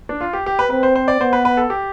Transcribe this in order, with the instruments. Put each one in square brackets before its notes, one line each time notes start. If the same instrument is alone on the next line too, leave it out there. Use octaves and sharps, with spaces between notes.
[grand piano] D4
F4
G4
G4
B4
[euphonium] C4 [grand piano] B4
[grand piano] C5
C5
D5
[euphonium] B3 [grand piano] C5
[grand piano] B4
B4
A4
G4